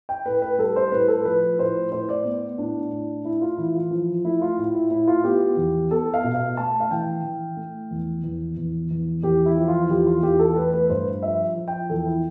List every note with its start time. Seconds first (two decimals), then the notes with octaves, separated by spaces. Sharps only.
0.09 G5
0.25 A2 B4
0.42 B4
0.58 G3 A4
0.76 C5
0.92 A2 B4
1.08 A4
1.25 F3 B4
1.59 A2 C5
1.92 A2 C5
2.09 D5
2.25 B3
2.58 A2 D4
2.92 A2
3.24 A2 E4
3.41 F4
3.58 E3 E4
3.75 F4
3.91 F3
4.25 A3 E4
4.41 F4
4.58 A2
4.75 E4
4.91 A2 E4
5.08 F4
5.24 B3 G4
5.57 E2
5.91 B3 A4
6.14 F5
6.24 B2
6.35 F5
6.57 A3 A5
6.80 F5
6.91 E3 G5
7.23 E3
7.57 A3
7.91 E2
8.24 E2
8.57 E2
8.91 E2
9.23 E2 G4
9.46 E4
9.57 F3
9.68 F4
9.90 E2 G4
10.07 F4
10.23 E2 G4
10.39 A4
10.56 A3 B4
10.73 B4
10.90 G2 C5
11.22 F3 E5
11.56 F3
11.68 G5
11.89 E2 A4
12.06 E4